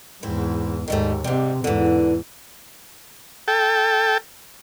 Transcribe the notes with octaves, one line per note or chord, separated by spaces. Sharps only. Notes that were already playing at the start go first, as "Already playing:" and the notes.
E2 G#2 C4 E4
D#2 G#2 D#3 G3 A3
G#2 C3 G3 C4
E2 G#2 D3 E3
A4 G5